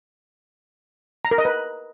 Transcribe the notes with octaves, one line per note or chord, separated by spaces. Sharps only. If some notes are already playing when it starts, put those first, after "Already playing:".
A#5
A#4
D#5
B4